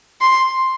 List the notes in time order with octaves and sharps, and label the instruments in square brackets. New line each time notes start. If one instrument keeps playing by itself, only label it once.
[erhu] C6